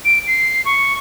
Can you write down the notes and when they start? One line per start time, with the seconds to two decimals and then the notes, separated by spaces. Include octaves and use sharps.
0.05 D7
0.27 C7
0.65 C#6